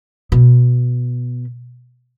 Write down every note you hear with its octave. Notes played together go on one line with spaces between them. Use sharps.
B2